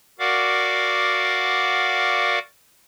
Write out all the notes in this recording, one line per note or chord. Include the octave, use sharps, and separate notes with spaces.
F#4 A#4 D5 F5 F#5 D6